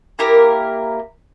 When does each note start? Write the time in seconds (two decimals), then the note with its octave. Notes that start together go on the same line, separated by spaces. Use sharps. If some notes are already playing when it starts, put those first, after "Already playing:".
0.19 A#3 E4 G4 A#4